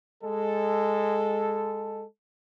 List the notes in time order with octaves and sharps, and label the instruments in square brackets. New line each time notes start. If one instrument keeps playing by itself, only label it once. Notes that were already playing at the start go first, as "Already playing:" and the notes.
[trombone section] G#3 A4